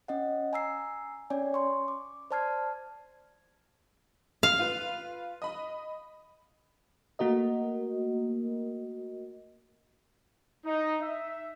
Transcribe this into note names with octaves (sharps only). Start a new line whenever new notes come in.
C#4 D#5 F#5
G#5 A#5 E6 C7
C#4 C#5 D5 G#5
C6 C#6
D6
C5 D5 A5 F6 G#6 C7
F5
F4 B4
D#5 B5
A3 A#3 F#4 A#4 D#5
D#4
E5